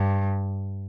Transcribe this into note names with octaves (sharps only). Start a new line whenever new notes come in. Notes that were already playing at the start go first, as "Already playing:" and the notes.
Already playing: G2